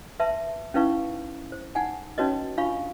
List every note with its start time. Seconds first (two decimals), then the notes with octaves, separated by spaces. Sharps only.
0.20 B4 E5 A5 C6
0.74 C#4 D#4 E4 B4 F5 C#6
1.52 C5
1.75 D#4 F#5 G#5
2.18 C#4 D#4 F#4 B4 C#5 D#5
2.58 D4 F4 F5 B5 C#6